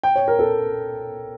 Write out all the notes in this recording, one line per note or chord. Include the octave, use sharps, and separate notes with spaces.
G5
C#5
A#4
A4